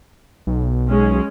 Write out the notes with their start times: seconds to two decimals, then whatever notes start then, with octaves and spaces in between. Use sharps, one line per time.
0.47 B1
0.88 G#3 C#4